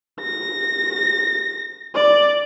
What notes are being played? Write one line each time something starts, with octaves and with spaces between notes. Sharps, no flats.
A#6
D5